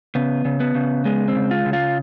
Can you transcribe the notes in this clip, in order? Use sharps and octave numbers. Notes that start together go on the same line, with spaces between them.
C#3 B3
C#3
B3
C#3
G#3 B3
C4
C#3
F4
C#3
F4